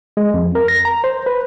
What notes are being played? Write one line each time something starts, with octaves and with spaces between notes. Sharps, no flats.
G#3
F2
A#4
A#6
A#5
C5
B4